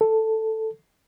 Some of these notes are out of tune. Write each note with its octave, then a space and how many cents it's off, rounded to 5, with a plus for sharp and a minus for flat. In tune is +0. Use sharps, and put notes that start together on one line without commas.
A4 +5